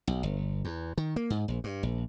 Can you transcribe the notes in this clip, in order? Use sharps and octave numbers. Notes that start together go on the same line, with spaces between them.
B1
G1
E2
D#3
A#3
G#2
A#1
G2
A#1